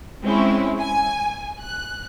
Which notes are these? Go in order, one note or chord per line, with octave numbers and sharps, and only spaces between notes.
G#3 C4 C#4 E4
G#5
F#6